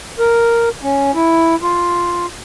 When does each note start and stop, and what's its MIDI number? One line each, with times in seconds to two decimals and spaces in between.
0.19 0.69 70
0.83 1.11 61
1.15 1.55 64
1.62 2.26 65